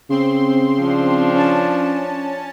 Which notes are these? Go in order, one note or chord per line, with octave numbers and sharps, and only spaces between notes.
C#3 C4 C6
F3 D4
C#4 A5